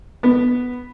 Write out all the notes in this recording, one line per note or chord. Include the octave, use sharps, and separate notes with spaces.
B3